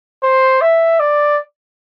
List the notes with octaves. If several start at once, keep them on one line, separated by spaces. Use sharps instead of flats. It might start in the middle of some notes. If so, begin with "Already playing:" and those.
C5
E5
D5